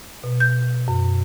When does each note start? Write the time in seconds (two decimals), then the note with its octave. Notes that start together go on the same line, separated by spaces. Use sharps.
0.24 B2
0.40 G6
0.88 F#2